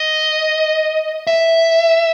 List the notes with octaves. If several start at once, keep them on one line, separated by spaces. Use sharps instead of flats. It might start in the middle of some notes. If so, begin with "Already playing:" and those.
Already playing: D#5
E5